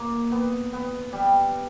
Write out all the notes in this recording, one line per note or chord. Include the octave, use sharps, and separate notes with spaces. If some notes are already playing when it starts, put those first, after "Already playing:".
Already playing: A#3
B3
B3
G3